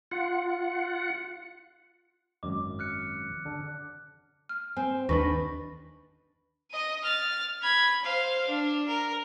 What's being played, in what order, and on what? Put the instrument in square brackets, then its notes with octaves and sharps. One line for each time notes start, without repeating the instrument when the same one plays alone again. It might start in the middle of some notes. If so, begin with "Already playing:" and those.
[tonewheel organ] F4 F#5
[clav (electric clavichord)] G#1 F#2 D#5 [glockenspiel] D6
[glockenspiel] F6 F#6 C#7
[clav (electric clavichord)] D3 A4
[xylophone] F6
[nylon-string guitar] C4 [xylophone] G#5
[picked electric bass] D#2 D#3 D4 [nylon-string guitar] B4 [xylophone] C#6 A#6
[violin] D#5 D#7
F6 A6
B5 G#6
C5 F5
D4
A#4